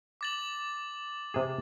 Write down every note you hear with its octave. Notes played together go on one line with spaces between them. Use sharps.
D6 A6 F#7
C3 G#4